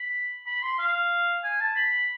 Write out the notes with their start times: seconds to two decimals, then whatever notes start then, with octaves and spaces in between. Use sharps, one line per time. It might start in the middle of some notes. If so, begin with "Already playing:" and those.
Already playing: B5
0.46 B5
0.62 C6
0.79 F5
1.44 G#5
1.60 A5
1.76 B5